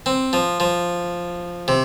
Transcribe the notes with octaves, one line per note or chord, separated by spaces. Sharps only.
C4
F3
F3
C3